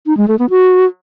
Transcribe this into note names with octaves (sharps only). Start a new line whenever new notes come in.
D#4
G#3
A3
B3
F#4